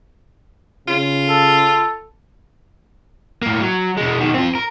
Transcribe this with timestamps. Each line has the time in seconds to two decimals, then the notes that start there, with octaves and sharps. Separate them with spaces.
0.88 C#3 F4
1.28 A4
3.43 A2 A#3
3.61 F#3
3.97 B2 G#3
4.20 B2 D#3
4.34 C4 F4
4.55 A#4